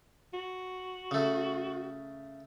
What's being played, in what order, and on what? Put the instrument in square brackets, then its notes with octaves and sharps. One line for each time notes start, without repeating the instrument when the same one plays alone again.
[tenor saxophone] F#4
[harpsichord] C#3 A3